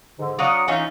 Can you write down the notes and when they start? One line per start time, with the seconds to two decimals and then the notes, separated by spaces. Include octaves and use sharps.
0.19 G#2 D3
0.39 F#3 D4 C#5 F5 C#6 D#6
0.68 E3 C#4 D#4 F4